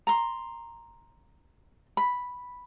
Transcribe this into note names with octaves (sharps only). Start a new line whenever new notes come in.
A#5 C6
B5